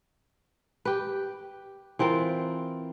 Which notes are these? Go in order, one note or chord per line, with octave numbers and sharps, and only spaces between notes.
G4 B4
E3 C4 F4 A#4